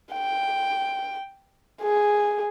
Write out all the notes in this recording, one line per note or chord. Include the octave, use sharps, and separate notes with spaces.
G5
G#4